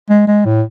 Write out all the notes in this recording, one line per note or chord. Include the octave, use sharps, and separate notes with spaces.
G#3
G#3
A2